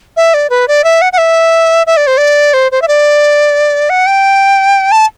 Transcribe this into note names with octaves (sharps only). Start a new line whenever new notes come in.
E5
D5
B4
D5
E5
F#5
F#5
E5
E5
D5
C5
D5
C5
C5
E5
D5
F#5
G5
A5